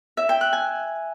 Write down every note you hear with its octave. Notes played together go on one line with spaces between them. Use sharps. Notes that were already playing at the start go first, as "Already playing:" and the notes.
E5
G5
F#6
G#5